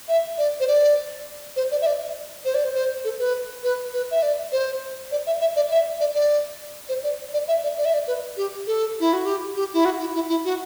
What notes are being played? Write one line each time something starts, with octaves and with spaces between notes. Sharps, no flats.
E5
D5
C5
D5
C5
D5
E5
D5
C5
D5
C5
C5
A4
B4
B4
B4
E5
D5
C5
D5
E5
E5
D5
E5
D5
D5
C5
D5
D5
E5
D5
D5
E5
D5
B4
G4
A4
E4
F#4
G4
G4
E4
F#4
E4
E4
E4
F#4